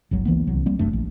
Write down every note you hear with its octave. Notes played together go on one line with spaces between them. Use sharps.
G1 C#2 F#3
C#2 E3 A#3 B3
C2 F#3
G3 A#3 C4
F1 F#2 A3 D4
A#1